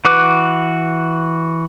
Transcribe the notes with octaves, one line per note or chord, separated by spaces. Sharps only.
E3 F#4 B4 D6 F#6